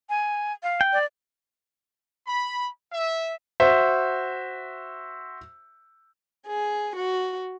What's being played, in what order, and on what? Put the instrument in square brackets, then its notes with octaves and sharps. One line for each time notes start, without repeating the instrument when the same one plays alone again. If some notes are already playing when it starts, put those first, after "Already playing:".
[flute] G#5
F5
[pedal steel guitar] G5
[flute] D5
[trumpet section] B5
E5
[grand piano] F#4 C5 E5
[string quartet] G#4
F#4